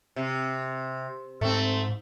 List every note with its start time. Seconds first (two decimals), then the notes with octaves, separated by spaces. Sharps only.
0.16 C3
1.41 G#2 A3 C4